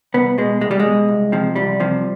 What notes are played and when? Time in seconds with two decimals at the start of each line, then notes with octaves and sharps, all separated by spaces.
0.14 C2 B3
0.38 B2 G#3
0.61 C2 G#3
0.71 G3
0.80 G#3
0.85 B2
1.08 C2
1.32 C3 F3
1.56 C2 G3
1.80 C3 F3